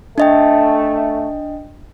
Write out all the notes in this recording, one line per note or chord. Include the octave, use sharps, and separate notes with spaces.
A3 D4 D#5 G5